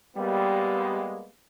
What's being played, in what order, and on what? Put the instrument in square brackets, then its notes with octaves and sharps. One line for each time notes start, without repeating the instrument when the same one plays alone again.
[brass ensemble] G3 G#3 A#3 B3